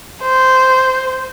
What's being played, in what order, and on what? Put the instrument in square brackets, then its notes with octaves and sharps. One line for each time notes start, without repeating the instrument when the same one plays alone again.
[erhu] C5